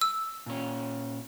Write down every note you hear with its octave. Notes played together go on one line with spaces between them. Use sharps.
E6
A#2 C#4